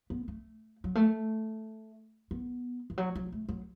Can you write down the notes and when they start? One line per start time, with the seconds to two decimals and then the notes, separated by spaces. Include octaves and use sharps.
0.10 B3
0.28 A3
0.84 F#3
0.95 A3
2.31 B3
2.90 E3
2.98 F#3
3.15 F#3
3.32 A3
3.49 F#3